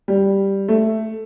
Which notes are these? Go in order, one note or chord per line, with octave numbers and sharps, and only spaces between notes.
G3
A3